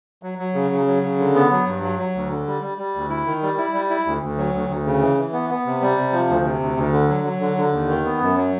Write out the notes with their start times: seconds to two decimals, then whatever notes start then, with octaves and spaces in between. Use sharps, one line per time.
0.23 F#3
0.38 F#3
0.54 C#3
0.71 C#3
0.87 F#3
1.03 C#3
1.19 D3
1.35 B3
1.51 F#3
1.66 G2
1.83 F#3
1.99 F#3
2.15 D2
2.31 D3
2.47 G3
2.62 G3
2.78 G3
2.95 D2
3.10 E4
3.26 D#3
3.43 G3
3.58 E4
3.73 G3
3.90 E4
4.06 D2
4.22 D2
4.38 F#3
4.54 D2
4.69 D2
4.86 C#3
5.01 E3
5.17 E3
5.33 B3
5.50 B3
5.66 C3
5.82 G3
5.97 C3
6.13 F3
6.29 D2
6.45 C3
6.61 D2
6.77 D2
6.92 D3
7.09 F#3
7.24 F#3
7.40 D3
7.57 D3
7.72 D#2
7.88 D#3
8.05 B3
8.21 F#2
8.36 F#3